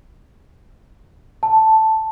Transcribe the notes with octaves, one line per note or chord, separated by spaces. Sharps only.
A5